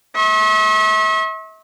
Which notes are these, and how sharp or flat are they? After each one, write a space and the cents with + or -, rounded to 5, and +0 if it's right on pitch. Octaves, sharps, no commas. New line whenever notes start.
E5 -40 C#6 -45